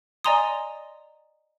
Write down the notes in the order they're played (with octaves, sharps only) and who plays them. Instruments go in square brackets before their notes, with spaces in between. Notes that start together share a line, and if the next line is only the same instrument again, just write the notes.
[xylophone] D5 D#5 G#5 A#5 C6 D#6